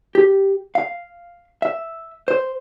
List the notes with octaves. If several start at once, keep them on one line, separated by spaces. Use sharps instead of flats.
G4
F5
E5
C5